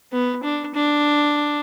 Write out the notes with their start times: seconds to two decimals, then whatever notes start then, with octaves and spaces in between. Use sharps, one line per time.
0.12 B3
0.43 D4
0.74 D4